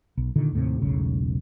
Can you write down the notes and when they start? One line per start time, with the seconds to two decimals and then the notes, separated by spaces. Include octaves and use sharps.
0.17 B1
0.36 A#2 D3 D#3
0.53 D#2 A2 C3
0.81 E1 B1 A2 C#3